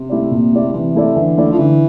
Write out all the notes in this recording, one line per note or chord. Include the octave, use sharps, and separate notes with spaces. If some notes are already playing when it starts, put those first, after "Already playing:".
Already playing: C3
A3 E4 G4 D5
A#2
A3 E4 G4 D5
C3 E3
A3 E4 A4 D5
D3 E3
A3 E4 A4 D5
F3
D3 E3